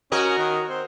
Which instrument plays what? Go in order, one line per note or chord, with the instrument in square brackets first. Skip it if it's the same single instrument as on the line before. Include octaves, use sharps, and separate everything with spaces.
[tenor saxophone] C#4 [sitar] F#4 A#4 D#5
[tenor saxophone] D#3
C4